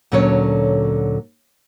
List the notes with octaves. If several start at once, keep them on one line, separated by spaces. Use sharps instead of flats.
D2 A#2 D3 F#3 C#4 C#5